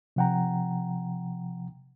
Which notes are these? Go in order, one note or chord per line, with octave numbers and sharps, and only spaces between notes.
C3 F3 F#5 G5 A#5